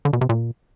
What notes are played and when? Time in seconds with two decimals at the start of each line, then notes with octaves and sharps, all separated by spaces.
0.05 D3
0.13 B2
0.21 C3
0.29 A#2